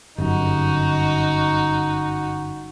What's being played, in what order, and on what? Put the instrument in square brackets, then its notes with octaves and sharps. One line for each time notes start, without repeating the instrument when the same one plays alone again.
[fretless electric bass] G1 F#2 [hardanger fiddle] D#4 F#4